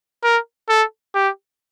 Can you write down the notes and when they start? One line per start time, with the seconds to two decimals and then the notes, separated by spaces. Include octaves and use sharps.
0.24 A#4
0.69 A4
1.15 G4